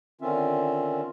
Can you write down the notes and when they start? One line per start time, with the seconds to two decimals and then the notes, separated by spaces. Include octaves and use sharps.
0.21 D3 D#3 C4 C#4 F4 E5